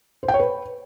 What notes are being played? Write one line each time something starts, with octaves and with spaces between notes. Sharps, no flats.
C5
G5
C#5
B4